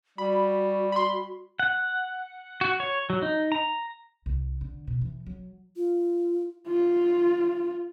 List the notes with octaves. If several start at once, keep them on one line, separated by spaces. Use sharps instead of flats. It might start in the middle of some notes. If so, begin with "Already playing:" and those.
G3 F#4 B5
B5 C6
F#5
F#4
C#5
F#3
D#4
A#5
C2
D3
B2
E3
F#3
F4
F4